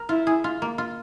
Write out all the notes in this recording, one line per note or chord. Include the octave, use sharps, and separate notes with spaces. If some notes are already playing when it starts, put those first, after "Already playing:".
Already playing: A#4
E4 F4
G#4
F4
A#3
F4